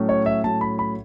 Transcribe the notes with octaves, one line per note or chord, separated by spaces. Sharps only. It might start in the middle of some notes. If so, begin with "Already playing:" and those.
Already playing: A2 F#3 C#4
C#5
E5
A2 F#3 C#4 A5
B5
B5